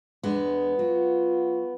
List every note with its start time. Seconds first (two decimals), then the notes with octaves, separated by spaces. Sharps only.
0.23 E2 G#3 B3 D4
0.79 F#3 F4